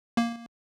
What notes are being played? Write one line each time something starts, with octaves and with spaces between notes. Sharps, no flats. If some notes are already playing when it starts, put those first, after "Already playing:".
A#3